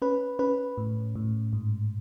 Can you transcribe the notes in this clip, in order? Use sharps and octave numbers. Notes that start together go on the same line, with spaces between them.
C#4 B4
C#4 B4
A2
A2
G#2